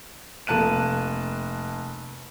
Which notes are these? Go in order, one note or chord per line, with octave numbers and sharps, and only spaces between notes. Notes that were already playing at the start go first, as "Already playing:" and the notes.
F1 A#3 A5 F#6 D#7